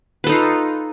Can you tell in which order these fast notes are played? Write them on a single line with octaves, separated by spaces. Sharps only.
B4 A4 D#4 F4